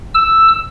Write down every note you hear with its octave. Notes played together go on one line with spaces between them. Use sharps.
E6